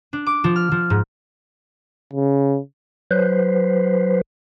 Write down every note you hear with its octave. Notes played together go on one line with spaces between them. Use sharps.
D4
D6
F3
F6
F3
G#2
C#3
F#3 B4 C5